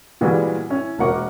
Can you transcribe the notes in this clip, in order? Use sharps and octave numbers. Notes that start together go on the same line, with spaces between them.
A#2 E3 G3 G#3 B3 F#4
C#4 E4
E1 A#3 A#4 F#5 C#6 D6